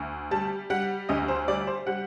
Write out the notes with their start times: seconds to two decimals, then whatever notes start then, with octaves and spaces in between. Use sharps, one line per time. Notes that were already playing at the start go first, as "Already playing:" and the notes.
Already playing: D2
0.31 G3 A5
0.70 G3 F#5
1.09 D2 D#5
1.28 C5
1.48 G3 D5
1.67 C5
1.86 G3 F#5